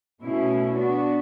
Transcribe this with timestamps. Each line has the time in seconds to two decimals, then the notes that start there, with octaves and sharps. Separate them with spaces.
0.22 B2 A3 C#4 E4
0.76 B3 D4 F#4